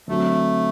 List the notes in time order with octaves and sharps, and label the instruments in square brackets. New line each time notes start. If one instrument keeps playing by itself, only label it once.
[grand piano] D3 F#3 C4 [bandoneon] A3